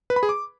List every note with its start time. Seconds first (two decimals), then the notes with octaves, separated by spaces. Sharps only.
0.10 B4
0.16 B5
0.23 G#4
0.29 D6